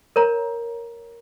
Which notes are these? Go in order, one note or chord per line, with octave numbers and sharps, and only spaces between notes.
A#4 C#5 A#5